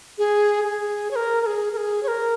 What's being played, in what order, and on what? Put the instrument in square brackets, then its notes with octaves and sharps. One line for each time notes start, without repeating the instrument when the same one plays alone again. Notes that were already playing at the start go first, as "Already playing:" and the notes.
[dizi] G#4
G#4
C#5
A#4
A#4
G#4
A#4
G#4
C#5
A#4